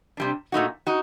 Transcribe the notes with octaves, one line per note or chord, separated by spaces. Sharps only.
C3 G3 D4
A#2 A3 D#4 F#4
D#4 F#4